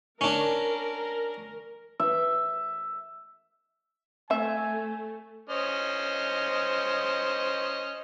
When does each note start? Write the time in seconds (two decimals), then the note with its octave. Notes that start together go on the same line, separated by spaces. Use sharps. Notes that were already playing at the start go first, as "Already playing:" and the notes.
0.21 C#4 D4 A#4
2.00 E5
4.30 A3 C4 E5 G#5
5.49 C#4 C5 D#5